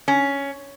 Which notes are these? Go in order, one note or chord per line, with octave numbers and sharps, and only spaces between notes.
C#4